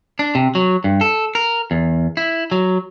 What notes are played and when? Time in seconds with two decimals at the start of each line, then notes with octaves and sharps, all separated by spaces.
0.19 D4
0.35 C3
0.55 F#3
0.84 G2
1.01 A4
1.35 A#4
1.71 E2
2.17 E4
2.52 F#3